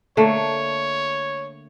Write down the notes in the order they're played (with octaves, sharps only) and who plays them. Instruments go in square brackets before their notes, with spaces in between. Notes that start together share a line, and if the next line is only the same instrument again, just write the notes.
[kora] D3 A3 A#3 [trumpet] C#5